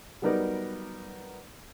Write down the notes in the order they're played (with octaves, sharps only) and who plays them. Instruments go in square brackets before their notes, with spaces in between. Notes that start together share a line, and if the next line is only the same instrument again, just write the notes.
[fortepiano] F#3 G3 B3 D#4 A#4 D5